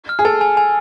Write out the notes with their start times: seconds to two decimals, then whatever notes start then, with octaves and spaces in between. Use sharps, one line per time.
0.09 F6
0.19 G#4
0.25 A4 G#5
0.41 G#5
0.57 G#5